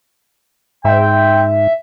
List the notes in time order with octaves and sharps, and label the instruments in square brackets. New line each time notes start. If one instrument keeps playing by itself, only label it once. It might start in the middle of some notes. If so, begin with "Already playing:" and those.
[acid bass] G#2 [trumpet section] C4 G5 [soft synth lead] E5